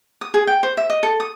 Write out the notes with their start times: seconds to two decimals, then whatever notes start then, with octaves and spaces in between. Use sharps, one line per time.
0.21 D#6
0.34 G#4
0.47 G5
0.63 C5
0.77 E5
0.90 D#5
1.03 A4
1.20 D#6